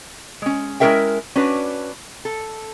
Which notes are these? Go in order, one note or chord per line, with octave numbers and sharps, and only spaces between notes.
G#3 C#4
G#3 C#4 E4 A#4 E5 G5
C#4 D4 F#4 B4
A4